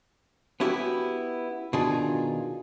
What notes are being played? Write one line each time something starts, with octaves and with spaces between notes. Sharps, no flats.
B3 C#4 E4 F#4 G4 E5
B2 D#3 D4 D#4 F4 G#4